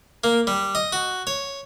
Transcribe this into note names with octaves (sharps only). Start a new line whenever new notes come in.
A#3
G3
D#5
F#4
C#5